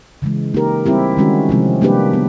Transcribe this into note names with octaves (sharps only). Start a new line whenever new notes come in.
C#3 E3 G#3
A#3 D#4 G4 A#4
G3 C4 E4 G4
D#3 G#3 C#4 F#4
C3 F3 G#3 C4
G3 A#3 D4 G4 B4
B3